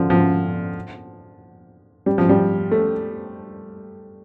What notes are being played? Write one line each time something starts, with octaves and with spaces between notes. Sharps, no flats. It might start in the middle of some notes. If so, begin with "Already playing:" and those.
Already playing: D3 F3
F3
G3
F3
G3
A3